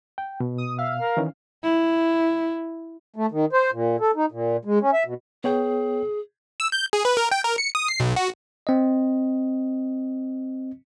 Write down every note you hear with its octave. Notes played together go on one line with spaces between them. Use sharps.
G5
B2
D#6
E5 F5
A#4
D#3 E3 C#4
E4
A3
D#3
C5
A#2
A4
D#4
A#2
G#3
C#4
E5
B2
B3 G#4 C#5 G5
E6
G6
G#4
B4
A#4
G5
A#4
C#7
D#6
C7
B1
F#4
C4 D#5